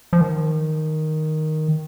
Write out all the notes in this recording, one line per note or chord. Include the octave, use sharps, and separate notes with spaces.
F3
D#3